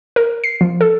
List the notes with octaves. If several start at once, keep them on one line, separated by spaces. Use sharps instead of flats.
A#4
C7
F3
A4